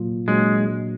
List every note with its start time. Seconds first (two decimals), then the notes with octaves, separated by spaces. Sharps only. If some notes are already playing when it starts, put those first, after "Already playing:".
Already playing: A#2 F#3 A#3 F4
0.28 A#2 F#3 G#3 A#3 D4 F#4